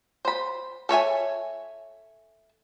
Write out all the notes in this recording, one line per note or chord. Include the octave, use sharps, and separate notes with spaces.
C5 B5
A4 C#5 E5 G#5